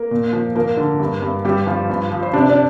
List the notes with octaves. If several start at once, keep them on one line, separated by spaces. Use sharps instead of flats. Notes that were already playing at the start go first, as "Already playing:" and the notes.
Already playing: A#3 A#4
A#2
F3
F3 A#3 A#4
D3
G2
G2
G2 G3 G4
G2 F3 F4
G2
F3
C5
C3 D4 D5
D4 D5